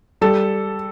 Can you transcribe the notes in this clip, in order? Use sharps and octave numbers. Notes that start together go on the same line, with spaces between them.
G3 A4